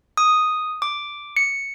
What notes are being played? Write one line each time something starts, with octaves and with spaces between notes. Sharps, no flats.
D#6
D6
C#7